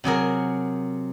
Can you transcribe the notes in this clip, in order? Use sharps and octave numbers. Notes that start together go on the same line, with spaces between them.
C3 F#3 G#4 A#4